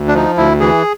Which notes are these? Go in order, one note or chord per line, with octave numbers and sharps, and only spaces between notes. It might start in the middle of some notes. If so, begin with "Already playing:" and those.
Already playing: D2
D4
F3 D#4
D2 E4
E3 G#4